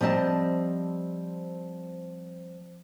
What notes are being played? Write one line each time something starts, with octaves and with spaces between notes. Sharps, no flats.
F3 G3 C4 D#5 A5